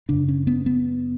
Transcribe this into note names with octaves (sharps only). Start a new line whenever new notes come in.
F#2 C#3 D4
C#4
B3
B3